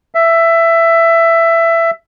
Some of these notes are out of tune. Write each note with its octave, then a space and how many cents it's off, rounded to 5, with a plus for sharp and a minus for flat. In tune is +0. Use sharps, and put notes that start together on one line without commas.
E5 +15